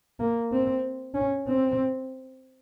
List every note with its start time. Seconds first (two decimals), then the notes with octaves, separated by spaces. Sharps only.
0.19 A#3
0.52 C4
1.15 C#4
1.48 C4